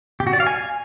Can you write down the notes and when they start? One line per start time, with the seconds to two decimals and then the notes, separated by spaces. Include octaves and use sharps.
0.20 G4
0.27 F#4
0.33 D5
0.40 F5
0.47 G#5